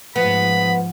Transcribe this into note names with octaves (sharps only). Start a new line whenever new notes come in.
G#2 F3 B3 B5